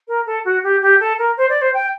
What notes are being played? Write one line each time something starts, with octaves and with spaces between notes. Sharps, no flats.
A#4
A4
F#4
G4
G4
A4
A#4
C5
D5
C5
G5